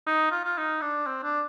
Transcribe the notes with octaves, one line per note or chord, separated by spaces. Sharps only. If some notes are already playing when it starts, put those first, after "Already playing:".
D#4
F4
F4
D#4
D4
C4
D4